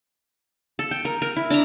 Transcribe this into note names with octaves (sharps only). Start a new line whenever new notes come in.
A4
G5
A#4
A#4
E4
D4 A#5